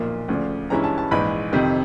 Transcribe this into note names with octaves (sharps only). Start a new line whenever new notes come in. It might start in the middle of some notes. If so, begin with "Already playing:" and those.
Already playing: B1 A#2 F3 A#3
D2 C#3 F3 A3 D4
G2 E3 G#3 C#4 E4 A#5
A5
A5
A#1 G#2 E3 B5
F2 C3 D#3